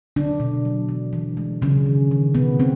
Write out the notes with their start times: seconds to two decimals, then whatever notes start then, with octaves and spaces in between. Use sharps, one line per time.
0.16 D3 F#3 D4
0.40 B2
0.65 F#3
0.89 E3
1.13 E3
1.37 G#3
1.62 C#3 F#3 C#4
1.86 D#3
2.11 D#3
2.35 B2 B3
2.59 B2 C4